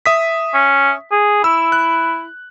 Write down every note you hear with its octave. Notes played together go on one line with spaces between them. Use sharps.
E5 D#6 B6
C#4
G#4
E4 E6
F#6